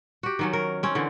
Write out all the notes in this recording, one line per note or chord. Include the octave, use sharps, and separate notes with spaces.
F#4 G4
D#3 F#3 C#4
A#4
C4 C#4
D3 E3 C4